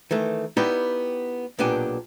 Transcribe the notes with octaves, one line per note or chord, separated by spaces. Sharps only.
D#3 E3 A3
B3 D#4 E4 G4 D5 G5
B1 A#2 B3 D4 G4 G#5